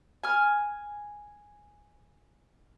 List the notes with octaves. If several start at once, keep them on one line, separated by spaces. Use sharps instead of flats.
G#5 F6